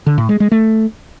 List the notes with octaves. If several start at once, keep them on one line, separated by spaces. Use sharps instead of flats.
D3
A2
G#3
G#3
A3